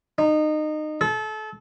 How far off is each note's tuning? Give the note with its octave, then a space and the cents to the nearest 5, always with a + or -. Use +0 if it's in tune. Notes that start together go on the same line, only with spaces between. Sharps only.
D#4 -25
A4 -30